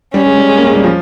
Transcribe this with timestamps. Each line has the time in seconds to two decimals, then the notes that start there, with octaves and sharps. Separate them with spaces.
0.14 G3 C#4
0.26 G#3
0.38 G3
0.49 G#3
0.57 A#3
0.67 G#3
0.75 G3
0.84 F3